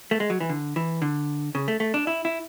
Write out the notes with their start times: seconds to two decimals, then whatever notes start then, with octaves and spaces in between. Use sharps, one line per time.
0.11 A3
0.20 G#3
0.30 F#3
0.40 E3
0.50 D3
0.76 E3
1.02 D3
1.55 C#3
1.68 A3
1.80 A3
1.94 D4
2.07 E4
2.25 E4